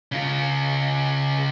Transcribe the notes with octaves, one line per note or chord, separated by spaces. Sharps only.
C#3 F4